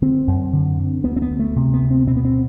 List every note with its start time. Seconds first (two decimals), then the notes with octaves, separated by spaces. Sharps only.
0.02 D3 C4
0.27 F#2
0.53 D3
0.79 D3
1.04 D2 B3
1.16 C4
1.22 B3
1.30 D2
1.39 A3
1.56 C3
1.74 B3
1.82 D2
1.91 C4
2.07 B2 C4
2.17 B3
2.25 C4